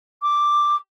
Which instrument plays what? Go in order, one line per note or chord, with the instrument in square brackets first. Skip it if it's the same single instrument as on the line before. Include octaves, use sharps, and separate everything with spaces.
[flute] D6